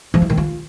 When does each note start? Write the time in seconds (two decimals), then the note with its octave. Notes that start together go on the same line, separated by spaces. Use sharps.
0.14 F3
0.22 E4
0.30 D#3
0.37 F4